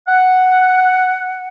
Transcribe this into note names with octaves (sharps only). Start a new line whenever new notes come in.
F#5